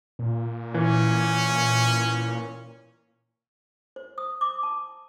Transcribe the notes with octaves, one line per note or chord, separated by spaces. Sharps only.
A#2
E3 C#4
C5
D#6
D6
A5